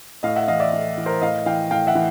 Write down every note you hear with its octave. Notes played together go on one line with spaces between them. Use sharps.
A2 D#5 F5
E5 F#5
E3 D#5 F5
D5 E5
A2
E3
A#4 C5
A2 D#5 F5
E3 F5 G5
A2 F5 G5
E5 F#5
E3